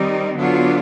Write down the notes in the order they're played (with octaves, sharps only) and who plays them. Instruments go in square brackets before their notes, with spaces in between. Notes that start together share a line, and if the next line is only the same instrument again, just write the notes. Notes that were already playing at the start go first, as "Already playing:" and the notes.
Already playing: [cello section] D#3 G3 C4 D#4
D3 F#3 B3 D4 F4